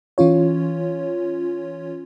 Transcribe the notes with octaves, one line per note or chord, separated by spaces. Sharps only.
E3 C#4 F4 C#5